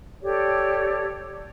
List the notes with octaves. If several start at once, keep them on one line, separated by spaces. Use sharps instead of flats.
G4 A4 C#5 D5